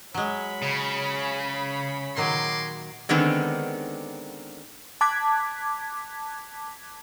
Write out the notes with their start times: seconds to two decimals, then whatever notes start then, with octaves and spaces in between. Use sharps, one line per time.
0.14 F#3 G#3 C#5 B5
0.62 C#3
2.17 A#2 D#3 F#3 G#3 C6 D6
3.09 D3 D#3 G#3 B3 C4
5.01 A5 D6 F#6 G#6 B6